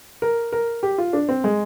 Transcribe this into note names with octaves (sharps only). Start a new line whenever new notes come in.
A#4
A#4
G4
F4
D4
C4
G#3